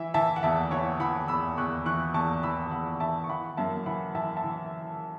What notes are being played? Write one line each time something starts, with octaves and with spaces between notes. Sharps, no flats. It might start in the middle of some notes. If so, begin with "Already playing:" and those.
Already playing: E3 E5
E3 E5 A5
F#5
E2 E5 A5
E3 C#5 F#5
E3 F#5 B5
E2 B5 E6
E2 C#6 F#6
E3 C#6 F#6
E2 A5 C#6
E3 B5 E6
E2 F#5 B5
E3 E5 A5
C#6
E3 F#5 B5
F#2 E5 A5
E3 F#5 B5
E3 E5 A5
E5 A5
E3